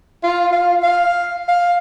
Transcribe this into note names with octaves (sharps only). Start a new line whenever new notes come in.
F4
F5
F5
F5